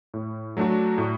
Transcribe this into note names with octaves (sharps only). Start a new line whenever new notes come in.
A2
F#3 A3 D4 F#4
A2